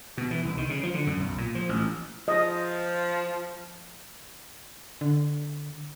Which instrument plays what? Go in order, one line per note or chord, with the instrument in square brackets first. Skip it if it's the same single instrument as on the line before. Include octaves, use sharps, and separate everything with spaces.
[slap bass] B2
E3
C2
D#3
C#3
F3
D3
F#2
B1
A#2
F3
A1
[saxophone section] F3 [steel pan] D#5
[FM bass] D3